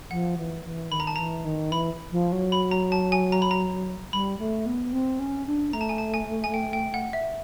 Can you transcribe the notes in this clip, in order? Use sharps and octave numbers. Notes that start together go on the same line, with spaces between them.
F3 F#5
E3
E3
D#3 B5
A#5
A5
E3 A#5
D#3
E3 B5
F3
F#3
B5
A#5
A5
G#5
A#5
B5
A#5
G3 B5
A3
B3
C4
C#4
D4
A3 A#5
A5
G#5
A5
G#5
G#5
G5
G5
F#5
E5